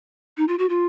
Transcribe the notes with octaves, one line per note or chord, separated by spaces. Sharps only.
D#4
F4
F#4
F4